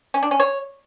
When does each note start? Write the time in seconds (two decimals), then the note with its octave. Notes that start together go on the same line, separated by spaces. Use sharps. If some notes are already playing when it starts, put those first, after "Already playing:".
0.14 C#4
0.23 D4
0.31 C#4
0.40 C#5